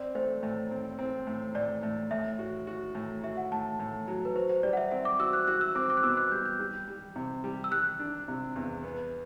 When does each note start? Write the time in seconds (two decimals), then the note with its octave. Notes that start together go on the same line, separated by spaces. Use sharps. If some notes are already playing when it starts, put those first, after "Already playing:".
Already playing: C4 D5
0.15 A3 C5
0.43 A2
0.71 C4
0.99 C4
1.27 A2
1.55 A2 D5
1.83 A2
2.11 A2 E5
2.39 F#4
2.67 F#4
2.95 A2
3.23 F#4 E5
3.37 F#5
3.52 A2 A5
3.80 A2
4.08 F#3
4.25 B4
4.35 F#4 C5
4.50 C5
4.63 G3 D5
4.73 F#5
4.77 E5
4.91 C4 E5
5.05 D6
5.19 F#4 E6
5.33 F#6
5.47 F#4 F#6
5.61 E6
5.75 C4 D6
5.90 D6
5.97 F#6
6.03 B2 E6
6.17 F#6
6.32 G3 G6
6.46 G6
6.60 G3
6.88 G3
7.16 C3
7.44 G3
7.64 E6
7.72 G3 F#6
8.00 D4
8.28 C3
8.56 E2
8.84 B3